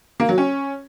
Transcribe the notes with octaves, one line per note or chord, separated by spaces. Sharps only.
A#3
F#3
C#4